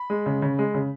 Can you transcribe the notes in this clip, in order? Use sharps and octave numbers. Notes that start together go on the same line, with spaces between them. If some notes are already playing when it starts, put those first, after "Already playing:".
Already playing: B5
G#3
C#3
C#3
G#3
C#3